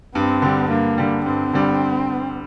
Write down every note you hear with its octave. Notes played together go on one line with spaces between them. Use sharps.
G2 C4
D3 G3
G2 A#3
D3 G3
G2 C4
D3 G3